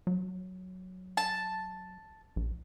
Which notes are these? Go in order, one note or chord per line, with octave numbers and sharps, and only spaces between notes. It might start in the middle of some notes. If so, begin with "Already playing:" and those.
F#3
A5
A#1